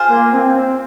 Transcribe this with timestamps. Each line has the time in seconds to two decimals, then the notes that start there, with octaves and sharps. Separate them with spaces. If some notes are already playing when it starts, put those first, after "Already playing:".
Already playing: F4 G#4 C5
0.09 A#3
0.33 C4
0.56 C4